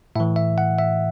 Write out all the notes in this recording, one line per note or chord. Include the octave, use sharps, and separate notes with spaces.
A2 E3 E5
E5
F#5
E5